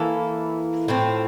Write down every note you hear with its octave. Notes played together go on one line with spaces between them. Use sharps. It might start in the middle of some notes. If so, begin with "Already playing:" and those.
Already playing: E3 A#3 E4 A4
A2 F3 C4